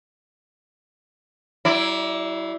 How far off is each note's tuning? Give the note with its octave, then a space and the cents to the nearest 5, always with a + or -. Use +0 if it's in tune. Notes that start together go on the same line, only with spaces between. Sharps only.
F#3 +45 E4 +0 D5 +0